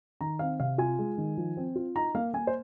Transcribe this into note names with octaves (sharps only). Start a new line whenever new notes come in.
D#3 A#5
C4 F5
C3 F5
F4 G#5
G#3
D#3
F3
C4
F4
D#4 A#5
A#3 F5
A#3 G#5
C5